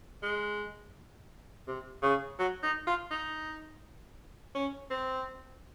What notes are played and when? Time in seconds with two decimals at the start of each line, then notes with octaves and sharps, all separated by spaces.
0.23 G#3
1.67 C3
2.03 C#3
2.39 F#3
2.63 D#4
2.87 F4
3.11 D#4
4.55 C#4
4.91 C4